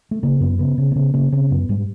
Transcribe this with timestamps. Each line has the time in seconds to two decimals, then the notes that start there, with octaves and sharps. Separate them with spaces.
0.11 A3
0.23 C#3 A#3
0.40 F#2 B3
0.59 C#3 B3
0.78 C#3
0.91 A#3
0.96 C#3 B3
1.14 C#3 A#3
1.32 C#3 C4
1.50 F#2 B3
1.69 G#2 G3